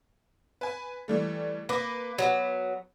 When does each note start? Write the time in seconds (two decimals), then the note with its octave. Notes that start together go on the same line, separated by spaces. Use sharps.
0.61 B4 G#5
1.08 E3 G3 A3
1.69 A#3 B4 D6
2.18 F#3 B3